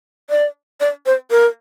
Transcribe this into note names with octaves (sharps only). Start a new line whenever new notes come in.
D5
D5
C5
A#4